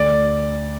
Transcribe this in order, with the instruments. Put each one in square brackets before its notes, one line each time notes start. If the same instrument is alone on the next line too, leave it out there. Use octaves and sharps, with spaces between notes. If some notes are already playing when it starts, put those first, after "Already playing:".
Already playing: [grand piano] D2 D5